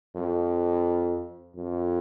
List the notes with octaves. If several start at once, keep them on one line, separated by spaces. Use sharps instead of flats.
F2
F2